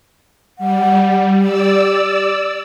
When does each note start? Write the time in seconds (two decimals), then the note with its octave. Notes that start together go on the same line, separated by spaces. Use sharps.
0.58 G3 F#5
1.41 G4 D5 E6